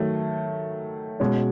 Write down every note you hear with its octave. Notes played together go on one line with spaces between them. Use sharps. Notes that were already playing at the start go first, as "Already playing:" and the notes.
Already playing: D#3 F#3 A3
B2 G#3 C#4 F#4